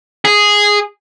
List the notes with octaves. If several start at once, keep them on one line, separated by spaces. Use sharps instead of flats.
G#4